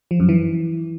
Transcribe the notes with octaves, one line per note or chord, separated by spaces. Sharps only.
F3
F#2
E3